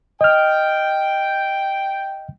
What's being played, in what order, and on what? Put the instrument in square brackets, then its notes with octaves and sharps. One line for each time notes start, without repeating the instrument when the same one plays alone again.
[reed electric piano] D#5 F6 [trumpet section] G5